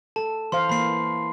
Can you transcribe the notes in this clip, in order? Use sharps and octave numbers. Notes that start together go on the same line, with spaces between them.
A4 A5
E3 C5 F5 C6
E3 A#3 B5 C7